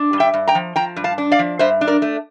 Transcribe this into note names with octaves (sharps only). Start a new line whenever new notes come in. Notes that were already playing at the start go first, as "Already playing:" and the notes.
Already playing: D4
G2
E5 G5
G2
G5 A#5
F3
F3 G5 A#5
G2
F5 A5
D4
D5 F5
F3
G2 C5 E5
D4
A#4 D5
A3